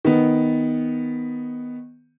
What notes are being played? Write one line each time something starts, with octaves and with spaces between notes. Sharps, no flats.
D#3 B3